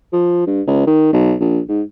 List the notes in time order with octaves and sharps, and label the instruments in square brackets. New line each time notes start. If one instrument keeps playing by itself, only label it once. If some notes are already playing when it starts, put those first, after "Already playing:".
[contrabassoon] F3
G2
C#2
D#3
B1
A#1
G#2